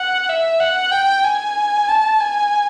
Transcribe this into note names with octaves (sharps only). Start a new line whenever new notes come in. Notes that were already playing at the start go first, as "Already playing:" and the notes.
Already playing: F#5
E5
F#5
G5
G#5
A5
G#5